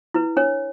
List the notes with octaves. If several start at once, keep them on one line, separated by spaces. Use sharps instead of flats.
E4 B4
D4 C#5